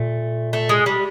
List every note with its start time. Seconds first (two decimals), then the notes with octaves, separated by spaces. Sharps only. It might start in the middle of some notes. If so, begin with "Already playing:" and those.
Already playing: A#2 A3
0.53 A3
0.69 G#3
0.86 G3